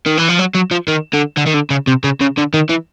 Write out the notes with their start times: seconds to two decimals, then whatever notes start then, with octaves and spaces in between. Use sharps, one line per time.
0.06 D#3
0.18 E3
0.29 F3
0.39 F#3
0.55 F#3
0.71 F3
0.88 D#3
1.14 D3
1.37 D3
1.47 D#3
1.54 D3
1.70 C#3
1.87 C3
2.04 C#3
2.20 C#3
2.37 D3
2.54 D#3
2.70 E3